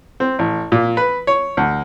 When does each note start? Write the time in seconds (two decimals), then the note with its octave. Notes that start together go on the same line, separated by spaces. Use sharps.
0.20 C4
0.39 A1
0.72 A#2
0.97 B4
1.27 C#5
1.57 D2